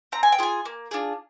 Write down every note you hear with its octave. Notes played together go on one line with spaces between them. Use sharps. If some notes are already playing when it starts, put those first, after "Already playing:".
C4 A#5
G#5
G5
F4 G#4 G#5
A#3
D4 F4 G#4